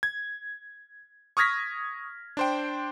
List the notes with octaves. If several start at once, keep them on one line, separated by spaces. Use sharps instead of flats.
G#6
C#6 D#6 F6 G#6 A#6 B6
D4 C5 G5